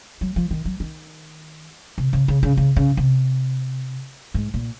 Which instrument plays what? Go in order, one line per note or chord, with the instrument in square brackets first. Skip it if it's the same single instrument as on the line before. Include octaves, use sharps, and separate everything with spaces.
[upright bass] F#3
F3
D#3
F#3
D#3
C3
C#3
C#3
C#3
C#3
C#3
C3
G#2
A#2